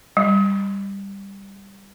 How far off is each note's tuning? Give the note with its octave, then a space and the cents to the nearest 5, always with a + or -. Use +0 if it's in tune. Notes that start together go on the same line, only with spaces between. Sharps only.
G3 +10